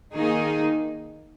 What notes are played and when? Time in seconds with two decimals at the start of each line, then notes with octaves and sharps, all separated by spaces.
0.13 D#3 A#3 D#4 G#4